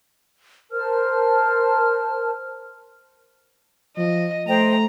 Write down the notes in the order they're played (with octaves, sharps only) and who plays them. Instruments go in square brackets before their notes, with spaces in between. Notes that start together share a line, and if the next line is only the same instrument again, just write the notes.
[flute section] A#4 C5 A5 F6
[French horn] F3 [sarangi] D#5
[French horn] A3 [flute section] C5 D#5 G5 [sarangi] A#5